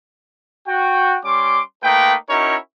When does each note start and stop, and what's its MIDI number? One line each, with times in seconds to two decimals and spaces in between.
0.68 1.18 66
0.68 1.18 79
1.24 1.62 55
1.24 1.62 61
1.24 1.62 84
1.24 1.62 86
1.84 2.14 57
1.84 2.14 58
1.84 2.14 63
1.84 2.14 71
1.84 2.14 79
2.29 2.56 61
2.29 2.56 63
2.29 2.56 64
2.29 2.56 66
2.29 2.56 70
2.29 2.56 73